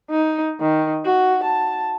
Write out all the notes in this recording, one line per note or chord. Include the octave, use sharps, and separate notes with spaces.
D#4
D#3
F#4
A5